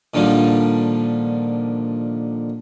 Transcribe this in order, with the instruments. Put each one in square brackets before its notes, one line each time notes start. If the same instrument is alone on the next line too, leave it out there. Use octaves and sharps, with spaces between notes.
[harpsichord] A#2 D3 D#3 F3 G3